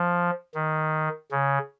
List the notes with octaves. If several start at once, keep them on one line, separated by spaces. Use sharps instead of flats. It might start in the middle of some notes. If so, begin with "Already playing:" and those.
Already playing: F3
D#3
C#3